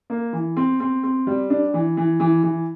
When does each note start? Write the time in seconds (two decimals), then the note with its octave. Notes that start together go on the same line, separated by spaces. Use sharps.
0.10 A#3
0.33 E3
0.57 C4
0.80 C4
1.03 C4
1.27 G3
1.50 D4
1.74 E3
1.97 E3
2.20 E3
2.43 E3